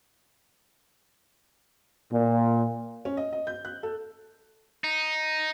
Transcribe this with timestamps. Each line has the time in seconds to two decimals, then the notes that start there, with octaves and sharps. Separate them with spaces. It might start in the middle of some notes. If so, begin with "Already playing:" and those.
2.11 A#2
3.05 C#4
3.17 D#5
3.32 D#5
3.47 G6
3.65 F#6
3.83 A4
4.84 D#4